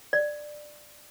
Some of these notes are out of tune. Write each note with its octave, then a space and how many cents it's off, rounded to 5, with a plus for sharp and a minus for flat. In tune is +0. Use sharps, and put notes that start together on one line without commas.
D5 +15